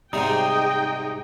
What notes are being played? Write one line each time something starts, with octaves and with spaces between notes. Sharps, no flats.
G#2 C3 G3 D#4 G#4 D#5 G5